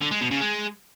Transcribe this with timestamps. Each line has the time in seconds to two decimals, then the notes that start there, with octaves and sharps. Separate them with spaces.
0.01 D3
0.11 G#3
0.21 B2
0.31 C#3
0.41 G#3